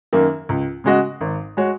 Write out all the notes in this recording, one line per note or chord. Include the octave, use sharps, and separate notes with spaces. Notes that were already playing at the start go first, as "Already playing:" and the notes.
F#2 D#3 A#3
C#2
C#3 G#3 F#4 D#5
G#1
G#3 F#4 C#5